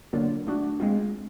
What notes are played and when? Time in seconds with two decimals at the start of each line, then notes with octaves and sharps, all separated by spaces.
0.13 D3 F#3 A#3 D4 F4
0.47 A3 D4 F#4
0.80 G#3 C4 F4